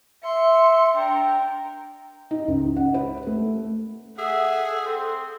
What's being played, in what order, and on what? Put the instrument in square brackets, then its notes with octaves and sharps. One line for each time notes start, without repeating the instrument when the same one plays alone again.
[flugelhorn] E5 [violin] C6 C#7
[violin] D4 A#4 [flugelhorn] G5
[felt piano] D#4
C#2
F#5
B4
A3
[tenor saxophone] G#4 [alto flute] A4 [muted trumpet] E5 [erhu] F#5
[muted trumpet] C4